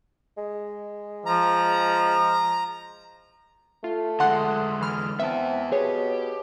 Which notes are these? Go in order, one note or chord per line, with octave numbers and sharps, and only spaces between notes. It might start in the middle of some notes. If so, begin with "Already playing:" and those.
G#3
F3 A#5
A3 F4
D3 G#3 F#5 C6 F#6
E3 B5 F6
B3 C4 E4 E5 A5
B2 G4 G#4 C#5